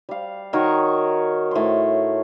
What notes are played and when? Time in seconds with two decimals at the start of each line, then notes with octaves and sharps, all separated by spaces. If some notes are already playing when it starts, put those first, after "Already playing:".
0.09 G3 F5
0.53 D#3 F#4 A#4 C#5
1.51 A2 C6